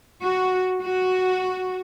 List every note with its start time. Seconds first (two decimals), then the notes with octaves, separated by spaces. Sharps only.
0.21 F#4
0.82 F#4